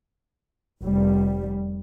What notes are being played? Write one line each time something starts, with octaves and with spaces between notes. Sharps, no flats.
F1 G3